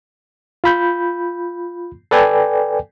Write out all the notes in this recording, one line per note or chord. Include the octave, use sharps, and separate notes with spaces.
F4 B5 G6
A4 B4 D5 G5 G#5